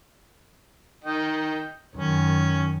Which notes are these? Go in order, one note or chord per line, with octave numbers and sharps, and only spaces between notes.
D#3 D#5 G5
F#2 D#3 C#4